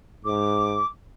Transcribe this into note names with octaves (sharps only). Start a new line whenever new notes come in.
G#2 D6